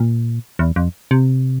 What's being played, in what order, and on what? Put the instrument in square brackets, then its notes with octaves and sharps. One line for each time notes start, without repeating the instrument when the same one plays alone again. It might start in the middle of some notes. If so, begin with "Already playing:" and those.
Already playing: [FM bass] A#2
E2
F2
C3